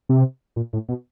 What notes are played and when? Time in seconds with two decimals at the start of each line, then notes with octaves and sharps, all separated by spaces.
0.09 C3
0.56 A#2
0.73 A2
0.89 B2